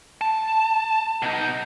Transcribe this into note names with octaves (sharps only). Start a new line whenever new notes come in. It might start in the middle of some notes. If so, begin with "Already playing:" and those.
A5
B2 D#4